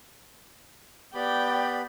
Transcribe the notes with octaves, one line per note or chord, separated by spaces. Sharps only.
B3 G4 D5 G5 B5